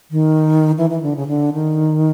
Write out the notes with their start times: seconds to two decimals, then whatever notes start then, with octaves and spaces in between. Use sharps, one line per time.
0.11 D#3
0.78 E3
0.90 E3
1.03 D3
1.16 C#3
1.28 D3
1.53 D#3